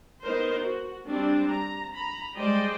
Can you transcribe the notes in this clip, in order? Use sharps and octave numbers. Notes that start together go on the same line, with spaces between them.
B3 D#4 A#4 C5
F#4
G3 C4 D4
A#5
A#5 B5
G3 G#3 C5 D5 D#5 G5